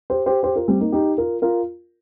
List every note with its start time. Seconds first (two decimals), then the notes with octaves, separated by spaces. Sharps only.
0.10 G4 C5
0.26 G4 C5
0.43 G4 C5
0.55 F4 A#4
0.68 G3 C4
0.80 A#3 D#4
0.92 D#4 G4
1.18 F4 A#4
1.42 F4 A#4